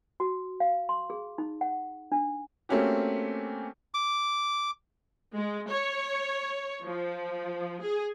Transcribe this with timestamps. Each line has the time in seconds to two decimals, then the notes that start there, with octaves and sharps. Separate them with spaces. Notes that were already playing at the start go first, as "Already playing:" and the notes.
0.20 F#4
0.60 F5
0.89 C6
1.10 G#4
1.38 D#4
1.61 F#5
2.12 D4
2.69 A3 A#3 C4 C#4 F#4 G4
3.94 D6
5.35 G#3
5.70 C#5
6.84 F3
7.82 G#4